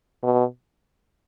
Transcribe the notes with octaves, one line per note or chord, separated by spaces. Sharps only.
B2